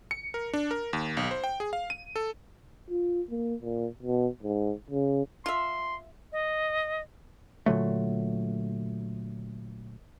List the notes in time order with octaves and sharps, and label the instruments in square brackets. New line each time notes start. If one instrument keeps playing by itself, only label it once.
[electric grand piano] C#7
A#4
D4
A#4
D#2
B1
C5
G5
G#4
F5
D#7
A4
[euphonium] F4
A#3
A#2
B2
G#2
C#3
[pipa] F4 E5 [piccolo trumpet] C6
[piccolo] D#5
[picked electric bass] A#2 D3 F#3 A3